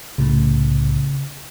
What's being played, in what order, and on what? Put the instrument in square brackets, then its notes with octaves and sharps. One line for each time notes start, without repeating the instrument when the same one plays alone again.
[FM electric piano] C2 A2 [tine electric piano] C#3